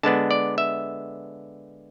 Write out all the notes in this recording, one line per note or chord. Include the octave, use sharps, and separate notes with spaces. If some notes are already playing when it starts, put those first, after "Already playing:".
D3 G#3 B3 D4 A5
D5
E5